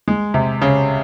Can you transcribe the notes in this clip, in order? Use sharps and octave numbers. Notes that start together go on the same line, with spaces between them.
G#3
C3
C#3